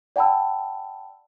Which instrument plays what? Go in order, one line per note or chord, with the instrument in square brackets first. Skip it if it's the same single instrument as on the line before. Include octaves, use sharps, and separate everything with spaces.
[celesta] D5 F#5 G5 A5 B5 E6